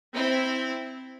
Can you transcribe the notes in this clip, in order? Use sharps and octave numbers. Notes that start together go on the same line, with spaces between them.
C4 E4